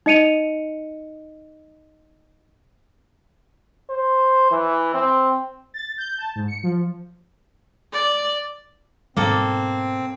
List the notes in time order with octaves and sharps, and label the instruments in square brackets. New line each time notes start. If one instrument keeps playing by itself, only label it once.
[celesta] D#4 D#5 C#7 D#7 F7
[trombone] C5
E3
C4
[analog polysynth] A6
G6
A5
G#2
C#7
F3
[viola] D5
[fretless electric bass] G#2 B2 G3 [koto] A#3 A4 [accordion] C4